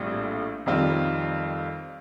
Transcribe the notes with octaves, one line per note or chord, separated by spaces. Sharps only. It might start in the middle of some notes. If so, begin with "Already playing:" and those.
Already playing: A#1 A2 G3 C4 F4
F2 D#3 G3 C4 F4